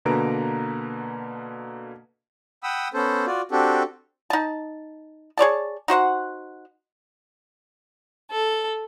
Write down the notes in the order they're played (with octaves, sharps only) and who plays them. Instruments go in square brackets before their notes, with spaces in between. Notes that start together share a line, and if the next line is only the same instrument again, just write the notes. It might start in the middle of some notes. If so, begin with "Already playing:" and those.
[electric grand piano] B2 D3 A#3 B4 A#5 D7
[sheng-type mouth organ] F#5 G5 B5 D#6 E6
B3 C#4 A4 C5
F4 F#4 D5
C4 D4 F#4 G4 A4
[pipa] D#4 A5
G#4 C#5 D5 A5
D#4 F#4 C5 F#5
[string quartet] A4